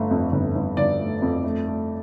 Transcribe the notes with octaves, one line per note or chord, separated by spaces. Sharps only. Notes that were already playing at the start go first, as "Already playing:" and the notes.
Already playing: G1 A3
F2
G1
G1
G1 D5
A3
F2
A3
A3